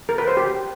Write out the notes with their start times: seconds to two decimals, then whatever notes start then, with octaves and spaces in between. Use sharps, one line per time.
0.09 A#4
0.18 B4
0.28 C5
0.37 G4